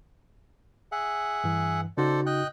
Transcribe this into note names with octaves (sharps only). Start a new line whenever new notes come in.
G#4 E5 F#5
G2 E3
C#3 D#4 F#4 A4 C5 D5
D#5 G5 F#6